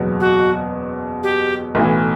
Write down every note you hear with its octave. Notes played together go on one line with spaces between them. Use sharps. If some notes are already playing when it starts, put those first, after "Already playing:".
Already playing: F#1 E2 B2 F#3
F#4
G4
B1 A2 E3